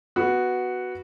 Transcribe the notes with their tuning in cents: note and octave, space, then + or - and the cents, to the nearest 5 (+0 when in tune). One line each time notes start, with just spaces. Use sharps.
B3 +0 F#4 +0